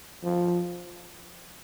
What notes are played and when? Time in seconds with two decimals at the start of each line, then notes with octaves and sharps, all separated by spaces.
0.24 F3